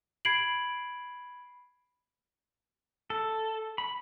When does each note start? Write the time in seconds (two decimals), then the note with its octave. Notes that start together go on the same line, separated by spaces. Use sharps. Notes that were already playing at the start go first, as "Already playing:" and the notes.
0.25 B5 G#6 C7 D7 F#7
3.10 A4
3.78 B5